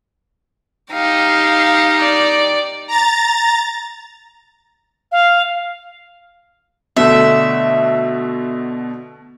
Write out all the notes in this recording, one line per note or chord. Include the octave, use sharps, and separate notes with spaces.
D#4 G4 F5
D5
A#5 A6
F5
B2 D3 A3 E5